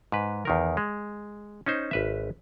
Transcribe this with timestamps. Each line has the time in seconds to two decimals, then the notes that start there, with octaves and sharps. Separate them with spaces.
0.12 G#2 B4
0.45 E2 D#3 A#4
0.77 G#3
1.66 C#4 D#4 C5
1.91 G#1 B4 E5